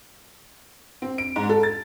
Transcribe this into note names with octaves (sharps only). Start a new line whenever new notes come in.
C4
D7
G#2
A4
A6